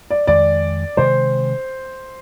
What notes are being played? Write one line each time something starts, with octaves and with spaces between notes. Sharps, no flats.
D5
F2 D#3 G#3 D5
C3 D#3 G#3 C5